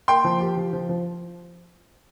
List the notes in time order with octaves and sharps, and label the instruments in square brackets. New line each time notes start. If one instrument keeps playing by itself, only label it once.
[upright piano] A#3 [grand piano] G5 C6
[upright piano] F3
G4
F3
F3
F3